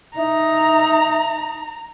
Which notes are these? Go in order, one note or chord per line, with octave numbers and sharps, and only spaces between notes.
D#4 E5 A#5